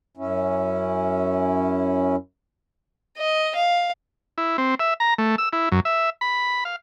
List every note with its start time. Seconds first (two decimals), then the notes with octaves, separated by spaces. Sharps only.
0.17 F#2 C#4 E4
3.18 D#5
3.55 F5
4.38 E4
4.58 C4
4.79 E5
5.00 A#5
5.18 A3
5.38 E6
5.53 E4
5.72 F#2
5.85 E5
6.21 B5
6.65 F5